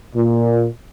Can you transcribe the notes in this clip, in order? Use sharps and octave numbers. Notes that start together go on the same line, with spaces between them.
A#2